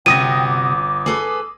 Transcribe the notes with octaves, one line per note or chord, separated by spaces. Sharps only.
G1 C3 F#4 G5 D#6 A#6 D#7
D6
G#4 A4 B4